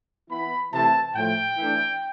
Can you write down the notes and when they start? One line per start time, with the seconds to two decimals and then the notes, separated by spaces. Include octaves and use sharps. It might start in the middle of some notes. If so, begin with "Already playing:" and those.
0.29 E3 B3 E4 B5
0.72 C3 E3 A3 C4 E4 A5
1.15 A2 F3 A3 G5
1.57 E3 A3 D4